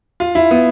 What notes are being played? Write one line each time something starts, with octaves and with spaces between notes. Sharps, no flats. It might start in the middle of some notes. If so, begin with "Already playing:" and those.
F4
E4
B3